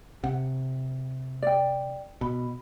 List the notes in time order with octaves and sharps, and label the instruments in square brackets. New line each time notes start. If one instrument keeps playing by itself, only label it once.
[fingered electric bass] C3 [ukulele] F#5
[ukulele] D5 G5
[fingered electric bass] B2 [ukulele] B5